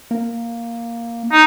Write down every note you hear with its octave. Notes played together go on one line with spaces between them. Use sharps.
A#3
D#4